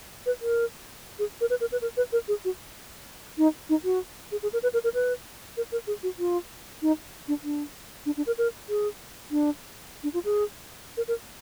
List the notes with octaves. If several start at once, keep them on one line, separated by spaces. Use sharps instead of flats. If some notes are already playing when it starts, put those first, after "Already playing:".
B4
A#4
G#4
A#4
B4
A#4
B4
A#4
B4
A#4
G#4
F#4
D#4
D#4
F#4
G#4
G#4
A#4
B4
A#4
A#4
B4
A#4
A#4
G#4
F#4
F4
D#4
D4
D4
D4
D4
A#4
A#4
G#4
D4
D4
F4
G#4
A#4
A#4